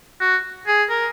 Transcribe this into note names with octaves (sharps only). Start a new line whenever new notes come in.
F#4
G#4
A#4